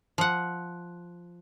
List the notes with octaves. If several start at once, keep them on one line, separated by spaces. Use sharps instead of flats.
F3 F#5